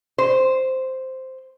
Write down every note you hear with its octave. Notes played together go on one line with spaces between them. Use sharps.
C5